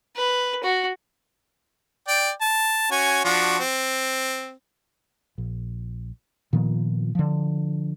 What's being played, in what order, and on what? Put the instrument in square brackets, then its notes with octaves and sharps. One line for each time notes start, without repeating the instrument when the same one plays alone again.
[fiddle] B4
F#4
[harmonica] D5 G5
A5
C#4 F#4 G#5
F3 D4 F#4
C4
[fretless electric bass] A#1
A#2 D#3 F3 B3
D3 F3